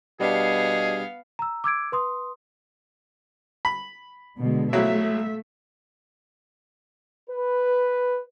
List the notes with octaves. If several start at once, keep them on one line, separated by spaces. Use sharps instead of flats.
B2 G3 B3 D4 G4 G#4 F5
A#5 E6
D6 E6 G#6 D7
B4 C6 D#6
B5
B2 D3 G#3
A#1 F#3 A3 E4 E5
B4